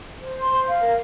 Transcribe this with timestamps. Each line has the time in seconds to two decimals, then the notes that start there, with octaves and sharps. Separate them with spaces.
0.20 C5
0.36 C6
0.50 C5
0.66 F5
0.81 A#4